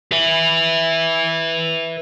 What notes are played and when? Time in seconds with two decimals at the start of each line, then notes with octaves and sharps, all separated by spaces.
0.12 B4 E5